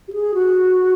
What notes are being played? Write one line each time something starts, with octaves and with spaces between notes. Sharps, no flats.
G4
G#4
F#4